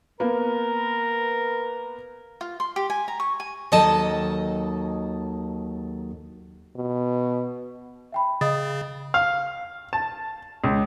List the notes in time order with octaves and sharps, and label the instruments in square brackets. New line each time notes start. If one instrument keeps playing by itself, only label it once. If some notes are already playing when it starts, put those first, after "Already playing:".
[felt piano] A#3 B3 [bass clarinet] A#4
[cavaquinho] F4
C6
G4
G#5
A#5
C#6
G#5
[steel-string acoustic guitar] D#2 D#3 F#3 A4 D#5 A5
[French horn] B2
[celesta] E5 G5 B5
[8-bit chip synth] C#3 [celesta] D#5 D#6 A6
[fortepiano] F5
A5
C#2